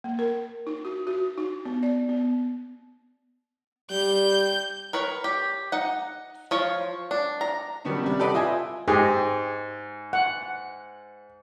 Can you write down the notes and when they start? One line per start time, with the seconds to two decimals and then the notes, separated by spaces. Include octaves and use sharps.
0.04 A#3
0.19 A#4
0.67 D#4
0.85 F#4
1.07 F#4
1.38 D#4
1.65 B3
1.83 D5
2.09 B3
3.91 G3 G6
4.93 A#4 B4 C#5
5.24 G4
5.72 D#4 F#5
6.51 F3 C#5 F5
7.11 D4
7.41 A#5
7.85 D#3 F#3 G3 B3 C#4 D4
8.03 C3 G3
8.19 G4 A4 B4 D5 D#5 F#5
8.34 F4 D#5 E5 G#5
8.88 G#2 G4 G#4 D#5
10.13 F#5